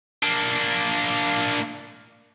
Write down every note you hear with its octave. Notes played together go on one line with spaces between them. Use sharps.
A#3 D4